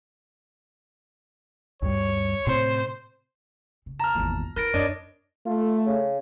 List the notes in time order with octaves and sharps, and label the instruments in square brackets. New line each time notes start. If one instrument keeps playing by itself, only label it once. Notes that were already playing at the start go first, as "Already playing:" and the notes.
[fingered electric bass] D2 G2 G3 [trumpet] C#5
[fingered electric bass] A2 C3 C4 [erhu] C5
[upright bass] C#3
[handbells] A5 [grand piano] A#5 F6
[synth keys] G#1 E2 A#2 [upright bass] F3 G#3
[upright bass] E4 [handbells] A#4 A#6 D7 [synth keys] B4 A5
[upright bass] F#2 C#4 [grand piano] D4 [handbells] C#5 D#5
[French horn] A3 [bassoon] F4
[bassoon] C#3